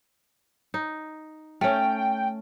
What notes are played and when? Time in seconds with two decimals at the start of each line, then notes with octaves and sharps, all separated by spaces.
0.74 D#4
1.61 A3 C#4 G5